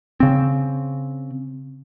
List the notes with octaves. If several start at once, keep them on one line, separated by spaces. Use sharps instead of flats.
C#3 C4